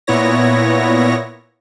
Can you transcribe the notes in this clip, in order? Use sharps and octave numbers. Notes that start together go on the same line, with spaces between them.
A#2 B3 E4 C#5 A#6